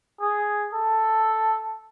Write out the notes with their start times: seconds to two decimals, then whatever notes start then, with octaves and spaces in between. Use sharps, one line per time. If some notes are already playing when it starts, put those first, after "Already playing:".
0.21 G#4
0.73 A4